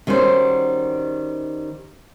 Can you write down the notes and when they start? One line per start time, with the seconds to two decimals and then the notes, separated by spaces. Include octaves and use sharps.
0.07 D#3 G3 C#4 F#4 C5